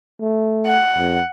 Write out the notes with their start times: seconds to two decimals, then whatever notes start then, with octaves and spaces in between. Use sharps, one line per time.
0.21 A3
0.67 F#5
0.98 F2